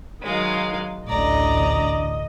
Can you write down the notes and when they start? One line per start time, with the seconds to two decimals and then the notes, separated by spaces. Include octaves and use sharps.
0.22 D#3 F#3 G#3 F5
1.07 A1 D2 D3 D5 D#5 A#5